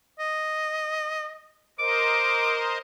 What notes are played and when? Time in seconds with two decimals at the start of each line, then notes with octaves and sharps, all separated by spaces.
0.19 D#5
1.79 A#4 C5 D#5 D6